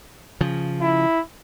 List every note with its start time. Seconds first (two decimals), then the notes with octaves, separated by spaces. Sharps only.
0.41 C#3 F3
0.81 E4